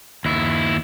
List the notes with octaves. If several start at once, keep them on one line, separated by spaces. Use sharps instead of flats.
D#2 E4